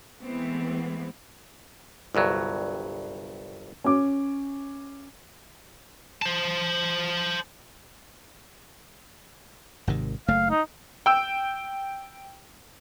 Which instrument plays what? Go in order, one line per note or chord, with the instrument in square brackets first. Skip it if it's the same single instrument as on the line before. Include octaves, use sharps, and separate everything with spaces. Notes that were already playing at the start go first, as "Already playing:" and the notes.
[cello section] E3 G#3 A3 B3 C4
[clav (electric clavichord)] G1 C2 G2 F#3
[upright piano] C#4 D6
[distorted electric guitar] C5 A5
[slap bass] G#1 C3 D#3
[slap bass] F#1 A3 [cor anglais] F5
[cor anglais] D#4
[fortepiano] G5 E6